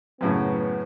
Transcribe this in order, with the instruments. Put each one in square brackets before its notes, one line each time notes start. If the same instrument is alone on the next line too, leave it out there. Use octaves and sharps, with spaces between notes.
[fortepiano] F#2 A2 C#3 [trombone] B3